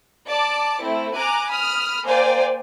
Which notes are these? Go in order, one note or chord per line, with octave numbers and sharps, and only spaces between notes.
D5 A5 D6
A3 C4 E4
G#5 A#5 D6 F#6
B5 D#6 F6
A#3 C5 D5 F5 G5 G#5